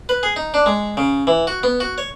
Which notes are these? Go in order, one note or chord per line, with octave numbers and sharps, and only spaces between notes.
B4
G#4
D#4
D4
G#3
C#3
E3
F#4
B3
F#4
C#5